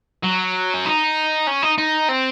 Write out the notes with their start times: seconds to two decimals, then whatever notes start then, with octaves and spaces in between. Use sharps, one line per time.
0.23 F#3
0.74 C#4
0.85 D#4
1.47 C#4
1.62 D#4
1.78 D#4
2.09 C4